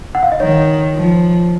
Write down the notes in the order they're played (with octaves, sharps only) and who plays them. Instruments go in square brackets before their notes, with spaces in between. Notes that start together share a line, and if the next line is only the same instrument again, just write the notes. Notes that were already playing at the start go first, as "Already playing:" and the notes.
[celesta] F#5
F5
D#5
[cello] D#3 [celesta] C#5
[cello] F3